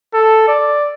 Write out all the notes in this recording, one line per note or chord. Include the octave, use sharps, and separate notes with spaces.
A4
D5